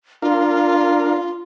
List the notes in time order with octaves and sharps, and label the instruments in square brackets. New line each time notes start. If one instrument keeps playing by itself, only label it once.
[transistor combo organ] D4 A#4 F5 [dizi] F4